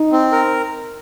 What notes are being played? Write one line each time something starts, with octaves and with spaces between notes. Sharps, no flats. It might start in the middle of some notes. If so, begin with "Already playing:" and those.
Already playing: D#4
C4
A#4